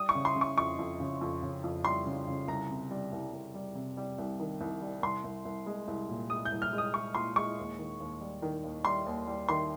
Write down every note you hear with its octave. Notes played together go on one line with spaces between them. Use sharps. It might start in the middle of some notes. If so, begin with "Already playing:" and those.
Already playing: G3 D#6
C#6
C#3
C6
C#3
C#6
F2 C#6
F2
C#3
F2
C#3
F2
G3 C6
C#3
C#3
C2 A#5
C3
G3
C2
C2
G3
C3
G3
C2
D#3
C2
G3
C2 C6
C2
C2
G#3
C2
A#2
G#3 D#6
G6
C2
F6
G#3
D#6
G#3 C#6
A#2 C6
G#3 C#6
D#2
D#3
D#2
G3
D#3
D#2
G3 C6
D#2
G3
D#3 C6